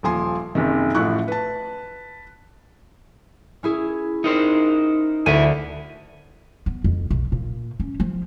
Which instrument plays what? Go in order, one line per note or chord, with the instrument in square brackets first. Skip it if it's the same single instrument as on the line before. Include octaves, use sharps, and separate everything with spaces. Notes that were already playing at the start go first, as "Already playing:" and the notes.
[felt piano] D#1 F3 G#5 C6
F#1 C3 D#3
A1 A2 F3 E4 C#6 F#6
B4 A5
[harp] C#4 E4 G#4
[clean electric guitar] D#4 A#4 C5
[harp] D2 [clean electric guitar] E4 G#5
[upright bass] B3
F2
B1
A#2
C#4
F3